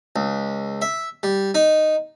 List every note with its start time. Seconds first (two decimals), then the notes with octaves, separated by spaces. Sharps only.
0.16 C#2
0.81 E5
1.23 G3
1.54 D#4